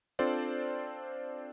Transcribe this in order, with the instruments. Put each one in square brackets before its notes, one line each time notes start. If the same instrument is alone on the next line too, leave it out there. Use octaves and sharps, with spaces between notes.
[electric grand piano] C4 D4 F4 A4 C5 D5